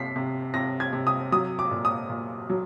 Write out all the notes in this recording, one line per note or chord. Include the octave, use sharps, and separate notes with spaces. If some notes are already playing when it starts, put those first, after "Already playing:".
Already playing: C3 B6 C7
C3
C3 A#6
G#6
C3
D#6
F#3 D#6
D6
A#2
D#6
A#2
F#3